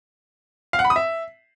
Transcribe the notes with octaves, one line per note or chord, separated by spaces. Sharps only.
F5
F#5
B5
D#6
E5